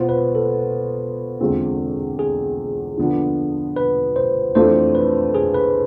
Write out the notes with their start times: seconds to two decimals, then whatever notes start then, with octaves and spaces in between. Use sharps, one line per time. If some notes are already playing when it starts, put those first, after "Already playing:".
Already playing: B2 B3 F4 C5
0.09 B4
0.35 A4
1.40 E2 D3 G#3 C4 F4
2.19 G#4
2.97 D3 F3 B3 D4
3.76 B4
4.16 C5
4.55 F2 E3 A3 D4 F4 C5
4.95 B4
5.35 G#4
5.54 B4